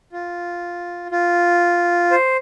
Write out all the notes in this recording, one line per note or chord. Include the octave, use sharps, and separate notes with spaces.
F4
F4
C5